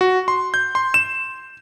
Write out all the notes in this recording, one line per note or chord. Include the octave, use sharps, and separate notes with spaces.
F#4
C6
G6
C6
E7